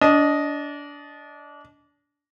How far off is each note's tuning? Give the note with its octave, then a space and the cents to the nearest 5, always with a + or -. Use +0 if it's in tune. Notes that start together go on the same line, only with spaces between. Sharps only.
D4 -25 D#5 +0